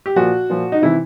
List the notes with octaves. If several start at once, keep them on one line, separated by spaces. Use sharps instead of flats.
G4
A#2 F3 F#4
A#2 F3
D#4
C3 E3 E4